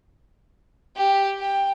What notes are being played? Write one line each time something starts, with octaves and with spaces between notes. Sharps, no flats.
G4
G5